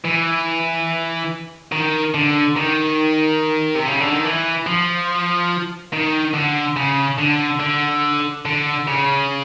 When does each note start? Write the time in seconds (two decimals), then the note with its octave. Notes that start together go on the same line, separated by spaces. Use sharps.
0.05 E3
1.72 D#3
2.14 D3
2.56 D#3
3.75 C3
3.87 C#3
4.00 D3
4.11 D#3
4.24 E3
4.67 F3
5.93 D#3
6.34 D3
6.76 C#3
7.18 D3
7.60 D3
8.45 D3
8.87 C#3